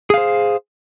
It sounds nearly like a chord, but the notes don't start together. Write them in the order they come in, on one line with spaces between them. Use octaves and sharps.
G#4 F5 C5